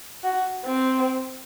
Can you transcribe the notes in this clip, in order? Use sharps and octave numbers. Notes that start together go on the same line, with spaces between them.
F#4
C4